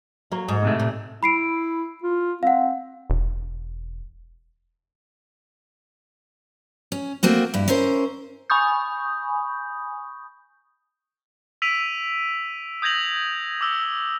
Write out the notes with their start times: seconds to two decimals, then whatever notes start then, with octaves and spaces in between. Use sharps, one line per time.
0.32 F#3 A#3
0.49 G#2
0.63 A2 C3 A3
0.80 A#2
1.23 E4 B5 C7 D7
2.03 F4
2.43 C4 F5 F#5
3.10 E1
6.92 C#4
7.23 A3 A#3 C4 F#4
7.54 G2 E4
7.68 C#4 E4 A#4 C5
8.50 G#5 B5 C#6 D#6 G6
11.62 E6 B6 D7 D#7 F7
12.82 D#6 G6 G#6 A#6 F7 F#7
13.61 D6 E6 G7